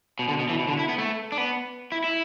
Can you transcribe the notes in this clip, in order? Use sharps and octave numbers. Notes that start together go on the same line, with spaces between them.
B2
D3
B2
E3
B2
D3
E4
B3
A3
D4
B3
E4
E4